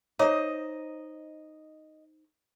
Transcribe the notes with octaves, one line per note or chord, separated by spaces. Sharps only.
D#4 C5 C#5 D#5 E5 D6